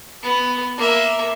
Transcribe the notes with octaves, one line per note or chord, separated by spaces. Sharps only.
B3
A#3 E5